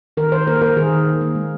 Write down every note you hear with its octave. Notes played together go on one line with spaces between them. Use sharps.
D#3 A#4
D#3 C5
A#3 A#4
A#3 A#4
D#3 G#4
D#3
A#3
A#3
G#3